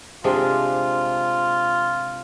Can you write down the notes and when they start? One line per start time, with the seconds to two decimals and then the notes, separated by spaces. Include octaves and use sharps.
0.24 C3 G#3 D4 F4